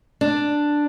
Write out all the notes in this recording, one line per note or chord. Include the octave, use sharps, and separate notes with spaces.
D4